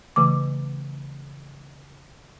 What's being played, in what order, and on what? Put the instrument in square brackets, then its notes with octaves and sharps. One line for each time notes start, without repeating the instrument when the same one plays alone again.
[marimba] C#3 E3 A3 D6